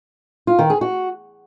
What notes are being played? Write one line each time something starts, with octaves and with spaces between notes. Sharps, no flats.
F4
D#3
G#4
F#4